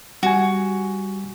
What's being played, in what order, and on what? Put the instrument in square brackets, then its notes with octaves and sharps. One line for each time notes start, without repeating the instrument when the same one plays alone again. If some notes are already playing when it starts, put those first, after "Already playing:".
[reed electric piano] G3 G#5 [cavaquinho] F#4